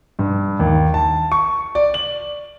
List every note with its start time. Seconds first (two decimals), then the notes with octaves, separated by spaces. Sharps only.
0.19 G2
0.59 D#2
0.94 A5
1.32 C#6
1.75 D5
1.94 F#7